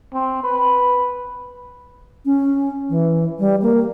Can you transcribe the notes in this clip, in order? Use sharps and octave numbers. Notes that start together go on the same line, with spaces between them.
C4
B4
C#4
E3
G3
A#3